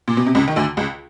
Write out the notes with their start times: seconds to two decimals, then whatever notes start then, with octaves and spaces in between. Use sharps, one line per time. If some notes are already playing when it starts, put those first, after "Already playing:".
0.08 A#2
0.17 B2
0.26 C3
0.35 C#2 C#3
0.48 D#3
0.56 D2 D3
0.77 C#2 C#3